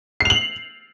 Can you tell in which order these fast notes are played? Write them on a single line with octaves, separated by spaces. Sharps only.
C7 F7 F#7